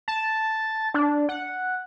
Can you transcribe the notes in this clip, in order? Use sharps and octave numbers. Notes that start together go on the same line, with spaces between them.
A5
D4
F#5